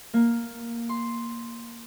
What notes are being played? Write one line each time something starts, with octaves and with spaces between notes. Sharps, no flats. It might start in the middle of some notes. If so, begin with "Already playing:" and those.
A#3
C6